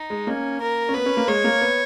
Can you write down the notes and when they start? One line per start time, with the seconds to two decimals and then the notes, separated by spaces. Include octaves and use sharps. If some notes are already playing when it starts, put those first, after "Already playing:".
Already playing: D#4
0.10 G#3
0.27 A#3 C#4
0.61 A#4
0.89 C#4
0.94 B3 B4
1.06 C#4
1.17 A#3
1.28 G#3 C#5
1.44 A#3
1.61 B3